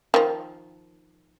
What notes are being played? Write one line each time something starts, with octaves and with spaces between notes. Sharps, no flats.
D#3 F3